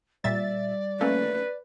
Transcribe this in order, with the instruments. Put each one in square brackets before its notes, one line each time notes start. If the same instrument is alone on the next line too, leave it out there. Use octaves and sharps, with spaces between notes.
[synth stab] A#2 E5 A6 [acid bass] G3 [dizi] D5
[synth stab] A3 A#3 C#4 [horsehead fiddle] B4